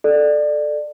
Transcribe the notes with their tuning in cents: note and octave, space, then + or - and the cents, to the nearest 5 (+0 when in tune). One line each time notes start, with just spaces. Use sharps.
A4 +0 D5 +20